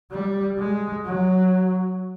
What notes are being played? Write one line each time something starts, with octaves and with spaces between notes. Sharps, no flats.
G3
G#3
F#3